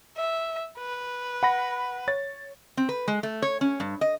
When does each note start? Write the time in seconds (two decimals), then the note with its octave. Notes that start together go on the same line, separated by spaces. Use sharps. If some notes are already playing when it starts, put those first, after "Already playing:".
0.17 E5
0.78 B4
1.43 F#5 B5 A#6
2.08 C#5 A6
2.77 C4
2.89 B4
3.08 G#3
3.23 A3
3.42 C#5
3.61 C#4
3.80 G2
4.01 D#5